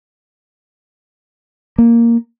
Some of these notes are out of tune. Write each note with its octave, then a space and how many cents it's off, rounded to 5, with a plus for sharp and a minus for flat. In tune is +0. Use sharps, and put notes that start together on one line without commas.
A#3 +0